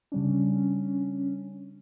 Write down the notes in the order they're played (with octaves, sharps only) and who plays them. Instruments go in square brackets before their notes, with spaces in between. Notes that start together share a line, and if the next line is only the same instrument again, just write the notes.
[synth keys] C#3 G3 D4 [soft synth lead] C#4